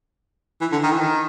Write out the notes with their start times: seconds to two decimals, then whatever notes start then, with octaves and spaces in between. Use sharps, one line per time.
0.61 E3
0.72 D3
0.83 D#3
0.91 E3
0.99 D#3